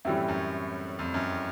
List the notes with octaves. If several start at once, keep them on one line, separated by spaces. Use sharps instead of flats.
F#2 A2 E3 G3 C4 E4
F#2
F2
F#2